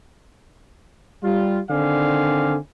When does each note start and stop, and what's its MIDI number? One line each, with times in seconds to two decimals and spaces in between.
1.23 1.59 55
1.23 1.59 65
1.70 2.58 50
1.70 2.58 51
1.70 2.58 60
1.70 2.58 74
1.70 2.58 77
1.70 2.58 80